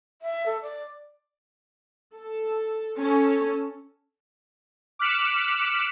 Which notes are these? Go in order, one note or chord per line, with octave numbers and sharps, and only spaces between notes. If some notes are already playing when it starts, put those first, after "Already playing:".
E5
A4
D5
A4
C#4 A4
D6 F6 F#6 B6 C#7 E7